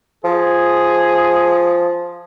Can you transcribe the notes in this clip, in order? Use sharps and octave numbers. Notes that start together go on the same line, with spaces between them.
F3 G#4